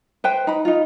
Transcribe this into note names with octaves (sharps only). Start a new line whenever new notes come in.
B4 C5 G5
D#4 B5
D#4 F4